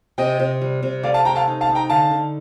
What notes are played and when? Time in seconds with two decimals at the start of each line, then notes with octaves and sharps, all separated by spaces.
0.18 C3 D#5 G5
0.40 C3
0.61 G3
0.83 C3
1.03 A3 D5 F5
1.14 F5 A5
1.25 A3 G5 A#5
1.36 F5 A5
1.48 D#4
1.61 F5 A5
1.69 D#4
1.75 G5 A#5
1.90 D3 F5 A5
2.11 D3